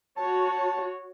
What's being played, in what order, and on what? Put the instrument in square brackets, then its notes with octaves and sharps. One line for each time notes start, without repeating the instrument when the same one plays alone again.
[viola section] F#4 C#5 [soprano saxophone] A5